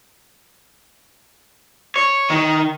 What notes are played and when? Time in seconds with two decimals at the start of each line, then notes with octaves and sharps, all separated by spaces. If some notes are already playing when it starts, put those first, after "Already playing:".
1.96 C#5
2.30 D#3